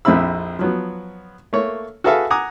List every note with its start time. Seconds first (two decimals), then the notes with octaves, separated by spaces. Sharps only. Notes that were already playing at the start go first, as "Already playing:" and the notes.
0.05 A#1 F2 C4 E4 B5 E6
0.59 F3 F#3 B3
1.53 A3 A#3 C#5
2.04 F#4 G#4 A4 B4 E5 F5
2.30 F#5 G#5 A#5 D6 D#6